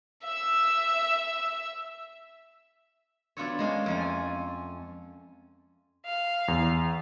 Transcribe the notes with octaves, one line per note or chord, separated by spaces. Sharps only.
E5 E6
B3 D4 F4 F#4 A4 C#5
G#3 A#3 C#4 F4
F2 A3 F4
G#5
F5
E2